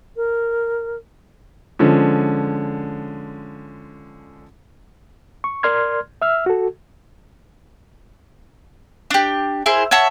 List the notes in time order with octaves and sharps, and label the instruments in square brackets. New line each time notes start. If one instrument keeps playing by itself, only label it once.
[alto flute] A#4
[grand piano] D3 F3 G#3 C#4
[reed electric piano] C#6
A#4 D5 C6 F6 G#6
E5 E6 F6
F#4 A4
[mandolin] D4 G4
E4 G#4 A#4 C5
C#5 E5 F#5 A5